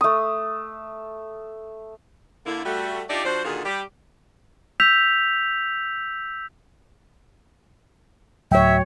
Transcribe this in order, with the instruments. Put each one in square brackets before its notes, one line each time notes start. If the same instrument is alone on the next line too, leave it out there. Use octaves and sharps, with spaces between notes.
[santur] A3 D#6
[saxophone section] D3 A#3 E4
G3 A3 F#4
D4 D#4 F4 G4 D5 E5
F3 D4 F#4 C5
A#2 D3 D#3 F4 F#4 G#4
G3 G4
[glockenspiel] E6 G6 B6 F7
[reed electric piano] D2 A2 G5 [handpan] F#3 C#5 [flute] E5